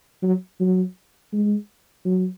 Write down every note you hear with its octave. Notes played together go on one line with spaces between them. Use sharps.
F#3
F#3
G#3
F#3